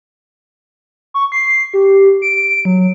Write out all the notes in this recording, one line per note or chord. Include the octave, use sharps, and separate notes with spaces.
C#6
C7
G4
D7
F#3